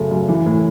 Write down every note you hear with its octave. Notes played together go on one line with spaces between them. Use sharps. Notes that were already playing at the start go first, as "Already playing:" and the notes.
Already playing: F#2 C#3 A3
F#2
E3
A2